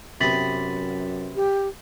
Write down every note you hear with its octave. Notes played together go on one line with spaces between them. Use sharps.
F#2 C3 B3 A6 B6 F#7
G4